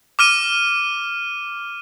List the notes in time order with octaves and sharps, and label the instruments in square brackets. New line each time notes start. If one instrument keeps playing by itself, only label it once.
[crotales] D6 F6 D#7